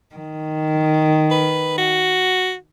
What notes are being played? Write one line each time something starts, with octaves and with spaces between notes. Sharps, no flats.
D#3
B4
F#4